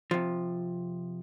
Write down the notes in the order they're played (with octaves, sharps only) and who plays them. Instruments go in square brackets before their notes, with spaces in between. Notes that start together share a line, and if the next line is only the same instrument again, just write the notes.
[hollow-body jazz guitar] C3 F3